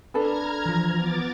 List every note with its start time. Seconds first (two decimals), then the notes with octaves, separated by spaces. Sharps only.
0.14 D4 A4 B4 A#5 F6 G#6
0.65 E3 F3
0.95 B3 D6 A6